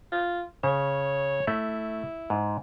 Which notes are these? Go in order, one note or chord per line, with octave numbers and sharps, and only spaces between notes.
F4
C#3 C#5
A3 E4
G#2